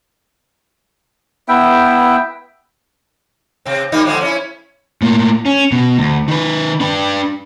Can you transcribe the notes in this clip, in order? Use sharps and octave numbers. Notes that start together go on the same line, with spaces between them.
B3 E4 E5 G5
C3 C4
G3 A#3 D#4
D3 F3 G#3
C#4 D4 E4
A2 A#3
C#4
B2
D2
D#3 B4
D4 B4